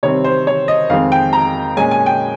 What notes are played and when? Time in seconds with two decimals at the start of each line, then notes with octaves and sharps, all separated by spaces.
0.03 C3 D#3 G3 C4 C#5
0.24 C5
0.47 C#5
0.68 D#5
0.90 F2 D#3 G#3 C4 F5
1.12 G5
1.33 A#5
1.77 A#2 G#3 C#4 G#5
1.91 G#5
2.06 G5